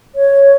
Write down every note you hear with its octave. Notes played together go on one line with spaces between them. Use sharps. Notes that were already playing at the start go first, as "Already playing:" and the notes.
C#5